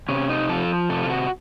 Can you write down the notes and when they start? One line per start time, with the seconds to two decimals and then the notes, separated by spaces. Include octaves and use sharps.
0.09 C3 C#4
0.29 D#4
0.49 F3 A4
0.90 C3 A4
1.03 F4
1.10 F#4